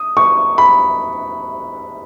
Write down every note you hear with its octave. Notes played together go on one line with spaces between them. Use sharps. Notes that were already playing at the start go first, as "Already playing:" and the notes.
Already playing: D#6
C#6
B5